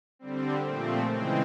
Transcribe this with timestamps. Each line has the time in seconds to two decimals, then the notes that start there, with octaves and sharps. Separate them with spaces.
0.19 D3 G3 C4
0.64 A#2 F3 A3 C4
1.09 C#3 E3 G#3 C4